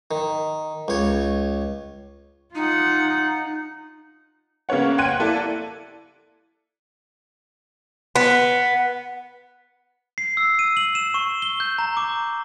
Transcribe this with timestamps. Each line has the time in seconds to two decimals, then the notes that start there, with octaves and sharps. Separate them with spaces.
0.11 D#3
0.88 C#2 C#5
2.55 D#4 F4 F#5
4.69 C#3 A#3 B3 C#5 F#5
4.98 F#5 G5 C6 F#6 G#6 D#7
5.19 A#3 E4 A4 D5
8.16 B3
10.18 C7
10.37 E6
10.59 D#7
10.77 F#7
10.95 E7
11.14 C#6
11.42 G7
11.60 G6
11.78 A#5
11.97 D6